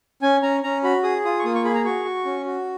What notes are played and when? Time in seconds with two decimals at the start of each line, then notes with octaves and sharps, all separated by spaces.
0.22 C#4 G#5
0.43 C#4 A#5
0.63 C#4 A#5
0.83 F#4 B5
1.03 G#4 D#6
1.25 F4 D#6
1.39 C#6
1.45 A#3 D#6
1.55 C#6
1.64 G#4 B5
1.75 A#5
1.85 F#4 C#6
2.05 F#4
2.25 C#4
2.46 F#4